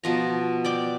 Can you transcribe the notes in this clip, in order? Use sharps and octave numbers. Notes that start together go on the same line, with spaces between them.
B2 F3 A#5
D5 G5 D6